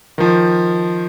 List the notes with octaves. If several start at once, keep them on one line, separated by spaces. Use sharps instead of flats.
D#3 F3